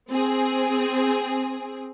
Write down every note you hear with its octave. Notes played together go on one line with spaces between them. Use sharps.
C4 G#4